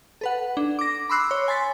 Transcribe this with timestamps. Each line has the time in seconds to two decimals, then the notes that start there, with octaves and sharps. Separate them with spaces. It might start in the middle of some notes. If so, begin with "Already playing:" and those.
0.21 A4 B4 F#5
0.57 D4
0.79 D6 A#6
1.09 B5 C6 D6 E6 F#6 C7
1.31 C#5
1.48 G#5 C6 A6 B6